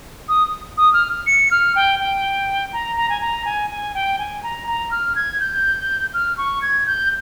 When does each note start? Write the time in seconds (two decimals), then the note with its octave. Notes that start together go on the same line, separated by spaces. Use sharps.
0.29 D#6
0.78 D#6
0.93 F6
1.27 C#7
1.51 F6
1.76 G5
2.00 G5
2.73 A#5
2.97 A#5
3.10 G#5
3.21 A#5
3.45 G#5
3.71 G#5
3.95 G5
4.19 G#5
4.43 A#5
4.67 A#5
4.91 F6
5.16 G#6
5.40 G6
6.14 F6
6.38 C#6
6.62 G#6
6.87 G6